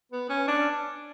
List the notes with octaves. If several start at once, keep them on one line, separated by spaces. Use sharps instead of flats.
B3
C#4
D4